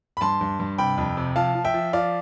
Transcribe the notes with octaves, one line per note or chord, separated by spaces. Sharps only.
B5
G2 A5 C6
G2
G2
C3 G5 B5
F2
C3
F3 F5 A5
F3
E5 G5
F3
F3 D5 F5